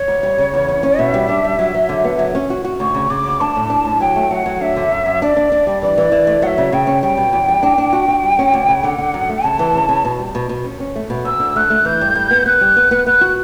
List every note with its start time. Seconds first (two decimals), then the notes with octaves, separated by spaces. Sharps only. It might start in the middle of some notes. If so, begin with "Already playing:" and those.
Already playing: C#5
0.08 D2
0.23 G3
0.38 C#3
0.54 E2
0.68 C#4
0.83 C#4
0.99 B2 E5
1.14 G3
1.29 D4
1.44 G3
1.59 F#3
1.74 F#3
1.89 D3
2.05 B3
2.19 F#3
2.35 C#4
2.50 F#4
2.65 F#4
2.80 D2 C#6
2.94 C#3
3.10 C#3 D6
3.26 D2
3.40 D4 A5
3.56 A2
3.70 D4
3.85 A2
4.00 F#3 G5
4.16 A3
4.31 F#3 F#5
4.46 F#3
4.61 D4 E5
4.76 D3
4.91 F#2
5.06 F#2
5.22 D4 D5
5.36 D4
5.52 D4
5.67 G3
5.82 E3 D5
5.97 E3
6.12 E3
6.27 A3
6.42 F#3 F#5
6.46 E5
6.58 C#3
6.72 C#3 G5
6.87 C#4
7.03 G3 G5
7.17 B2
7.33 E2
7.48 G3
7.63 D4
7.78 D4
7.93 F#4
8.08 F#4
8.23 G3
8.39 C#4
8.54 D2
8.69 C#3
8.84 D3 F#5
8.98 D3
9.14 F#2
9.29 A3
9.44 C#3 A5
9.59 E3
9.75 C#3
9.89 C#3
10.05 B2
10.20 G3
10.35 B2
10.49 B2
10.64 C#4
10.80 C#4
10.96 A3
11.10 B2
11.25 D2 E6
11.40 D3
11.56 A3 F#6
11.70 A3
11.85 E3 G6
12.01 G2
12.15 G2
12.31 B3
12.46 B3 F#6
12.61 G3
12.77 B3
12.91 B3
13.07 B3 F#6
13.21 F#4